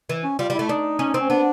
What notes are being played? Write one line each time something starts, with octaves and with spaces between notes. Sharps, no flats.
E3
C#4
G3 F4
G3
A3 E4
D4 D#4
C#4
C4
C#4
B3 D4